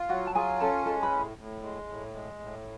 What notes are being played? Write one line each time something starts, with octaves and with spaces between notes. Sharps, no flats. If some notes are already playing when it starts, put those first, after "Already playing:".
Already playing: F4
F#3 F#4 F#5
A5
F4 G#4 G#5
C#4 A4 A5
G#3 A4 A5
B4 B5
A2
A2
G#3
A2
G#3
A2